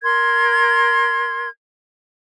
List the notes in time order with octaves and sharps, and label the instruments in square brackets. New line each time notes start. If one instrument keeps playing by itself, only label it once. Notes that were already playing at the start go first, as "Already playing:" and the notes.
[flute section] A#4 C6 G#6